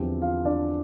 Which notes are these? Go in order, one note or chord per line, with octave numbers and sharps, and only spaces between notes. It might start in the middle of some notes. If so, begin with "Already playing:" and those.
Already playing: E2 D3 F3 C4 E4 G4
F4 F5
D4 D5